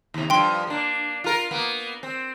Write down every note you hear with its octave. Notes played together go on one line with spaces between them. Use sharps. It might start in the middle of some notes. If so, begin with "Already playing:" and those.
D#2 C3
G2 F3 G5 C6
A#3 D4
F4 A#4
A#3 B3
C4